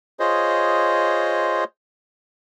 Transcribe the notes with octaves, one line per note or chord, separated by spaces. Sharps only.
F4 G#4 C5 C#5 D#5